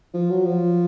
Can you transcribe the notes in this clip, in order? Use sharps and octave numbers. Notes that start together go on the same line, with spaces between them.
F3
F#3
F3